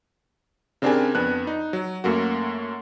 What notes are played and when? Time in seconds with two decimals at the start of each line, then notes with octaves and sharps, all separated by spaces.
0.82 C#3 C4 D4 G4 A#4 G#5
1.15 F2 B3 D4 F#6
1.47 D#4
1.73 F#3
2.04 F#2 A3 A#3 F#4